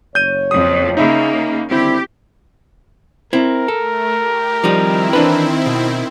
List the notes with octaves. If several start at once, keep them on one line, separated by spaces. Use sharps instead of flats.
F#1 C#5 G6 D#7
F2 D#6
C#3 A#3 D#4 E5 B5
D3 D#3 G3 C4 E4 G4
C4 E4 A#4
A3 A4
G4
D#3 F3 G3 C4 D#4 E4
E3 D4 B4
B2